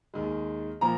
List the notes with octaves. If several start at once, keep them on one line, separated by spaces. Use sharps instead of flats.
D#2 D#3 G#3
A#2 F3 A#3 A#5